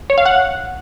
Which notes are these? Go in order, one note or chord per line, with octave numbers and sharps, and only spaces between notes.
C#5
F5
F#5